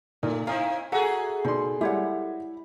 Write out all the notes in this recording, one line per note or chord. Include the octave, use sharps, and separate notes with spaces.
A#2 A3 D#4
C4 D#4 E4 D#5 F5 A#5 D#6
F#4 G#4 A4 E5 F#5 G#5 A#5
B2 D#4 D5 C6
G3 G#3 E4 G4 C#5 F#5